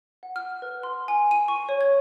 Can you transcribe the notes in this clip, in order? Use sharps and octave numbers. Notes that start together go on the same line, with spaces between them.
F#5
F6
B4
C6
G#5
D#7
C#6
C#5
G#6